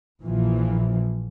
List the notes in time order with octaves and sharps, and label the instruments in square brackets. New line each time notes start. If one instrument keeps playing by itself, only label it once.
[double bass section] A#1 A#2 E3 F3